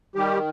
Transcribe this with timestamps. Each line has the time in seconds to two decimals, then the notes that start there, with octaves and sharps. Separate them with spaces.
0.15 D#3 G3 G4